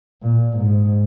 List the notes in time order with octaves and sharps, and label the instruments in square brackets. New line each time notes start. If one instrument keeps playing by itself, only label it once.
[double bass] A#2
G#2